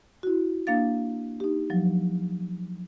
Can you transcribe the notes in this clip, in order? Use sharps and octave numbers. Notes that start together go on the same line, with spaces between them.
E4 F#4
A#3 D4 F5 A6
D#4 G4
F3 F#3